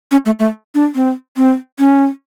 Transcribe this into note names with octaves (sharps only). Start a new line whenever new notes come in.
C#4
A3
A3
D4
C4
C4
C#4